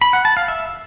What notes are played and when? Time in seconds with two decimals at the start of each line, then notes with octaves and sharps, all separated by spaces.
0.01 B5
0.13 F#5
0.25 A5
0.37 F5
0.48 E5